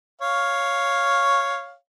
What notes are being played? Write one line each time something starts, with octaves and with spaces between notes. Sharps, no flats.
C#5 F5